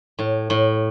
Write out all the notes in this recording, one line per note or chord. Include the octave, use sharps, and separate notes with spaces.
A2
A2